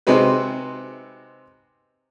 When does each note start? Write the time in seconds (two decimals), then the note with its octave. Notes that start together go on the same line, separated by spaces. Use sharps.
0.07 C3 G#3 C4 D#4 F#4 B4